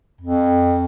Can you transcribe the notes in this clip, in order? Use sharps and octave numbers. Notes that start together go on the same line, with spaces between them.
F2